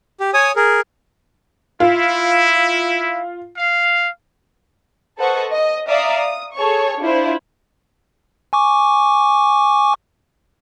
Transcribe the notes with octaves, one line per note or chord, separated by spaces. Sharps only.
G4
C#5 G#5 D#6
G#4 A#4
E4 F4
F5
A4 B4 C5 D#5 F#5 C#6
D#5
D5 E5 F5 A#5 D#6
D#6
G#4 A4 C#5 C#6
D4 E4 F4 C5
G#5 C#6 D6